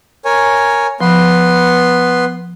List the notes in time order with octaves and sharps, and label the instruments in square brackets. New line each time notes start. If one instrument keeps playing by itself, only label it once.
[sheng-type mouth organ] A#4 C#5 G#5
[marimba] F3 [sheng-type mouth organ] B3 B4 C6